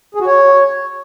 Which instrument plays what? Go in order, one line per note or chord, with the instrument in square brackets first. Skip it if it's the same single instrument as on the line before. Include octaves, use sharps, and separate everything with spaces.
[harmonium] G#4
F#4
C#5